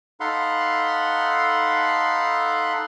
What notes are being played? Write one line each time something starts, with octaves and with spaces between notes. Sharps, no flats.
D#4 A4 F5 F#5 B5 C6